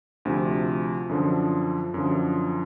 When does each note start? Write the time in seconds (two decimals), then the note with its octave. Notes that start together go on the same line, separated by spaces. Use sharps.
0.25 D2 C3 F3
1.09 F#2 D3 F3
1.94 F#2 D3 F3